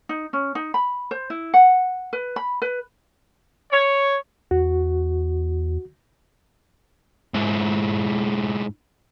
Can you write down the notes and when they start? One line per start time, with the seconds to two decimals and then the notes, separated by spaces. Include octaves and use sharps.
0.09 D#4
0.33 C#4
0.55 D#4
0.74 B5
1.11 C5
1.30 E4
1.54 F#5
2.13 B4
2.36 B5
2.62 B4
3.72 C#5
4.51 E2 F#4
7.34 G#2 E4